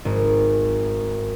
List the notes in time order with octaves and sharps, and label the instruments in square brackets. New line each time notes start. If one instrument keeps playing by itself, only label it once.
[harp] G#1